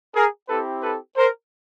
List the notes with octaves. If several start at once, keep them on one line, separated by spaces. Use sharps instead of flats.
G#4 A#4
C4 E4 G4 A4 B4
A4 B4
A#4 C5